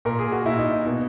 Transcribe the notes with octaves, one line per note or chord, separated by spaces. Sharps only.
A#2 A#4
G#4
F#4
A#2 E4
D#4
D#4
B2